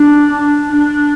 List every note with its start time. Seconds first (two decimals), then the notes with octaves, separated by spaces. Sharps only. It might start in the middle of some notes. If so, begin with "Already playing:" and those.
Already playing: D4
0.72 D4